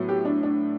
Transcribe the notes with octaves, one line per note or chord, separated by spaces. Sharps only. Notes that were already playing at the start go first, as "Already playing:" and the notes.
Already playing: A2 F#3 B3
G4
D4
D4